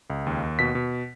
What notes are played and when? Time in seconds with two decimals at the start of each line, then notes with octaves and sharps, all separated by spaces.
0.10 C#2
0.27 D#2
0.43 D#2
0.59 B2 B6
0.75 B2